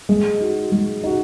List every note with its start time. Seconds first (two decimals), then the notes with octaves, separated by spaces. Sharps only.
0.09 G#3
0.40 D#4 F#4
0.72 G#3
1.04 D#4 F#4